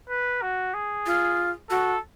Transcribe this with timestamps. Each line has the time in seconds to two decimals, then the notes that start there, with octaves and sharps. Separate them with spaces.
0.10 B4
0.42 F#4
0.74 G#4
1.06 F4
1.70 F#4 A4